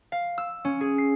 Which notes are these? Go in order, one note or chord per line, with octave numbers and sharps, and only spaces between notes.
F5
E6
C#4
G#4
C7